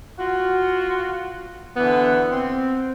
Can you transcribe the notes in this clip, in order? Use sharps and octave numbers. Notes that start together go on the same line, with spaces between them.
F4 F#4
D3 E3 B3
C4